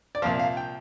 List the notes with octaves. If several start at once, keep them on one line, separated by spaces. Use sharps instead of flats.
D5
C2 A#2 F3 F5
F5
G5